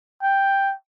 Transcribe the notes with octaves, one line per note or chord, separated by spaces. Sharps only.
G5